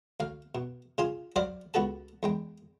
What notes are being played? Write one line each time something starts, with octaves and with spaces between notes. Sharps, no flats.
D2 F5
B2
C#3 F4 G#5 C6
F#3 C5 D5 F5 B5
C#2 B3 F#4 A4 A5
E2 G#3 G5